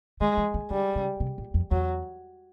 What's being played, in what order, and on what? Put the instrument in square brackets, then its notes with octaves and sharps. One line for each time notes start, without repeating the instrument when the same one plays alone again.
[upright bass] D#3 [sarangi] G#3
[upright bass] E3
D#3
[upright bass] D3 [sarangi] G3
[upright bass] C#3
C3
A#2
F2
[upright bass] E2 [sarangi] F#3